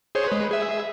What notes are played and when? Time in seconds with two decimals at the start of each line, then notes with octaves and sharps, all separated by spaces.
0.15 G#4 C5 C#5
0.28 G#3 B4
0.51 G#4 E5